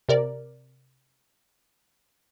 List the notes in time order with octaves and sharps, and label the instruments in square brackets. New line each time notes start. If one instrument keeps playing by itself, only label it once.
[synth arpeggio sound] C3 A#4 D5